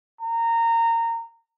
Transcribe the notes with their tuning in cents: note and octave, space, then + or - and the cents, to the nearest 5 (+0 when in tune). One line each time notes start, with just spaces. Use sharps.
A#5 -20